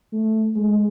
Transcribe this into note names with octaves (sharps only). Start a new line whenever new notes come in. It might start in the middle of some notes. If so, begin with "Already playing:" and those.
A3
G#3